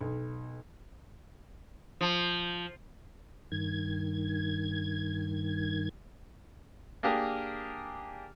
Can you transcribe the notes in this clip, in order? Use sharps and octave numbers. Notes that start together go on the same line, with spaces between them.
B1
F3
G2 D#3 G#6
A#3 D4 G4 G#4 A#4